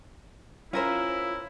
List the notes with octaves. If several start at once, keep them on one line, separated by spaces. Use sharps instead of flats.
C#4 E4 F4 A#4 C5